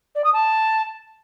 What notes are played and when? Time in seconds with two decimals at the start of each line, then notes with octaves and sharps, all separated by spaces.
0.15 D5
0.24 D#6
0.33 A5